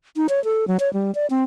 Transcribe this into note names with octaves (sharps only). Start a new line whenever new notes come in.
D#4
C#5
A4
F#3
C#5
G3
D5
C4